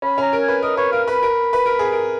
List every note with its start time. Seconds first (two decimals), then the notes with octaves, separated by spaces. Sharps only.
0.02 C#4 B5
0.18 C#4 A#5
0.33 A#4
0.42 G#5
0.48 B4
0.63 A#4 D#5
0.77 B4 C#5
0.92 A#4 F5
1.08 B4 B5
1.23 A#4
1.53 B4
1.66 A#4
1.79 G#4
1.92 A#4